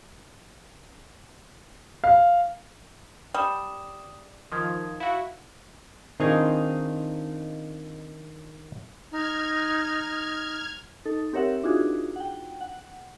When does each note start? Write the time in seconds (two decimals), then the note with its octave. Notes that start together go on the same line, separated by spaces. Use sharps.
2.04 F5
3.34 G3 D#6 E7
4.52 D#3 F3 D#6 G#6
5.00 E4 F#4 F5
6.20 D#3 C4 D4 D#4 F4 G#4
9.11 D#4 F6 G#6
11.06 D#4 A4
11.33 C4 G4 A#4 C#5 E5 F#5
11.64 D4 D#4 F4 F#4 G#4
12.16 F#5 G5
12.61 F#5